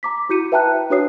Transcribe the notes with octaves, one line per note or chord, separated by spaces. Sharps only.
A#5 D6 B6
E4 F#4 G6 C#7 D#7
B4 E5 G5 A5 A#5 F#6
D4 F#4 B4 C#5 D#6 C7